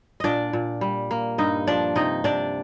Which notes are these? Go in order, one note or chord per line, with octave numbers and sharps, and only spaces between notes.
A#2 D4 D5 D#5
A#2
G3
A#3
G2 D#4 D#5
F3 D4 D5
C3 D#4 D#5
C3 D4 D5